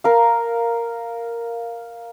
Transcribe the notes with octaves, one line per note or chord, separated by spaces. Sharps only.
A#4 F5